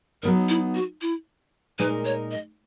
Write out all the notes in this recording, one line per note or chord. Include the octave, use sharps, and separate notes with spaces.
F#3 B3 D#4 A#4
E4
F#4
E4
A#2 G#3 D#4 A#4 B4
C#5
D#5